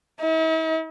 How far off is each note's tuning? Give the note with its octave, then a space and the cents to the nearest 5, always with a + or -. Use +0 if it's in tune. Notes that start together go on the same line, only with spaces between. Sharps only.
E4 -45